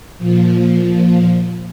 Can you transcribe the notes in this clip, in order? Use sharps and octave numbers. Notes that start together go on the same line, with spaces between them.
A#2 F3